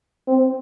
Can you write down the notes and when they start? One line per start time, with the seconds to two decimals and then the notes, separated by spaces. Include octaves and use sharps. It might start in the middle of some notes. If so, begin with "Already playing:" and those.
0.27 C4